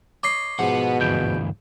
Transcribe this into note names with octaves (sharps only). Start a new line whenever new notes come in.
C#5 D#5 B5 D6 C7
G#2 B2 F3 B3 F#5
D2 G2 E3 G6 D7